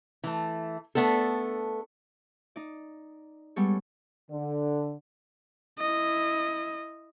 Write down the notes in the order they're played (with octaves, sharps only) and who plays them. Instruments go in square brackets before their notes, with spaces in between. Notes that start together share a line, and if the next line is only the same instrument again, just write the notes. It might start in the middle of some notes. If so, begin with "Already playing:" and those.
[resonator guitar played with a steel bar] E3 A3
A3 B3 D4 A4
[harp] D#4 D5
G3 G#3 B3 A4 C#5
[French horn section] D3
[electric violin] E4 D#5